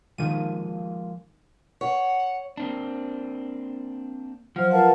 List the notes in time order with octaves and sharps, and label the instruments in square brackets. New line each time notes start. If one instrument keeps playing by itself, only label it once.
[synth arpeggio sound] D#3 D#7 [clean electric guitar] F3 G#3 A#3
[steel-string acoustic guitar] C#5 [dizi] F#5
[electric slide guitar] A#3 C4 D4
[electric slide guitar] F3 [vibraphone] F#3 [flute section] C5 F6
[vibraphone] F4 B4 F#5 [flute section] A#4 F5 A5